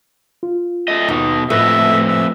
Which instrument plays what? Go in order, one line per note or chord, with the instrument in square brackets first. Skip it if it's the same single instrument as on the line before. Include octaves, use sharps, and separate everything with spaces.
[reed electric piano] F4
[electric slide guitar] A3 D#5
[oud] D#2 [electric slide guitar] B2 D#4
[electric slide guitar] F2 B4 D#5 [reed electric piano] A2 F4 [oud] A3 [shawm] E5
[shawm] E5